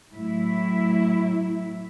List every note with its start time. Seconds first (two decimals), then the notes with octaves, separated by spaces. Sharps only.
0.15 A2 F#3 E4